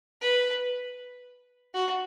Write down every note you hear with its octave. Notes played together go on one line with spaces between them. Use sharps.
B4
F#4